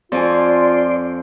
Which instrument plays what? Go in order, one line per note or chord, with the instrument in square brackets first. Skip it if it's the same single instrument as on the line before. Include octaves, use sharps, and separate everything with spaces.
[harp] F2 G#5 [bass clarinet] F4 [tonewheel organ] D5 C6